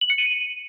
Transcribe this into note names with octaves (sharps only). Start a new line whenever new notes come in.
F#7
C#7
D#7